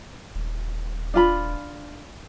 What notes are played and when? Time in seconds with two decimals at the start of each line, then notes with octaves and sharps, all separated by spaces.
0.34 D#1
1.14 D4 F4 B5